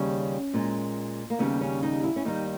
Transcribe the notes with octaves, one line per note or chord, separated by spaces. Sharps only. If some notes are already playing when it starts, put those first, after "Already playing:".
Already playing: D#2 C#3 G3 C#4
A#2 G#3
A#3
D#2 C#3 G3 B3
C#4
D#4
E4
C#4
D#2 D#3 G3 D#4